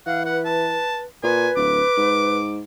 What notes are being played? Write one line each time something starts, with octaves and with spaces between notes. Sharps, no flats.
E3 F5 F#5
B4 F#5
A5
A#2 B4 G#5
D1 D6
G#2